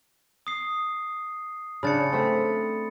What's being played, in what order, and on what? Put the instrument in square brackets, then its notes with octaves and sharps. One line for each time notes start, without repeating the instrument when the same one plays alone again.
[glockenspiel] D#6 C7
[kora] C#3 D4 [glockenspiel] B5 A6 C#7
[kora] A3 C4